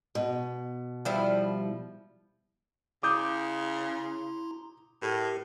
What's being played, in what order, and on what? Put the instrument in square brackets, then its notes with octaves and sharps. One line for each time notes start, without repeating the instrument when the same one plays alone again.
[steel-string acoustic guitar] B2
[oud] F3 G3 E4
[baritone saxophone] C#3 [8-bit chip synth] E4 A#5 C6 [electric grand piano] D6 D#6 G6
[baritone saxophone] A2 [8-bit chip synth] G4 A#4